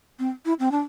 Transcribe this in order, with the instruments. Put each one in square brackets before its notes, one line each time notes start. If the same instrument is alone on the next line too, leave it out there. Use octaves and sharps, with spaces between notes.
[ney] C4
E4
C4
D4